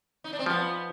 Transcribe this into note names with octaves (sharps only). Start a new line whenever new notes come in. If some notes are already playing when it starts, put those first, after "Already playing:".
D#4
D4
C4
F3 B3